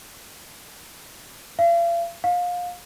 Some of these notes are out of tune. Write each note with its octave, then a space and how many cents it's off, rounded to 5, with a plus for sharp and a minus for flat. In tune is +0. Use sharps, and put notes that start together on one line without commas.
F5 -40
F5 +25